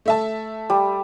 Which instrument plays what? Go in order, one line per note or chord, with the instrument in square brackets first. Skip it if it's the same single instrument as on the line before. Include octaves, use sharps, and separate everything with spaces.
[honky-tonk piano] A3 E5 A5
[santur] G3